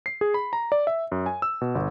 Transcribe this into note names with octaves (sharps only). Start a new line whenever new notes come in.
C7
G#4
B5
A#5
D5
E5
F#2
G#5
E6
B2
G1